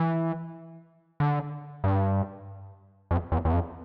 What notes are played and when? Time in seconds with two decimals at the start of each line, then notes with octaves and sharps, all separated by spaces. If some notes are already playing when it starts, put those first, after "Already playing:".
Already playing: E3
1.20 D3
1.84 G2
3.11 F2
3.32 E2
3.45 E2
3.53 F2